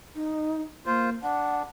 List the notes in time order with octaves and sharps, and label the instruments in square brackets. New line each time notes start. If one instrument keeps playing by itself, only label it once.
[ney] D#4
[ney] A#3 [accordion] F4 C5
[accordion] D4 [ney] F#5